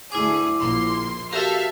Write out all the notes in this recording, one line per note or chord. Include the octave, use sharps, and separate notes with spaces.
D2 E4 G#4 D6
A#1 A#3 C6
F#4 G4 A4 A#4 E5 F5